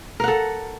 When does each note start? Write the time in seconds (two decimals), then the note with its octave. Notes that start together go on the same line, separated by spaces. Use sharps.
0.20 A#4
0.24 F#5
0.28 A4